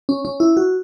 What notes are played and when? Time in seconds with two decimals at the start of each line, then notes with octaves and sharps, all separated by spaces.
0.09 C#4
0.25 C#4
0.40 E4
0.57 F#4